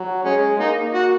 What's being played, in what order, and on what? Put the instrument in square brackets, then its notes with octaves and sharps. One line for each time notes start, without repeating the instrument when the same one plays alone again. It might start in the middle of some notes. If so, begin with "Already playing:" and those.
Already playing: [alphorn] F#3
[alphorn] G#3 [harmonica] C#4
[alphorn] A#3 [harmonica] D#4
[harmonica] F#4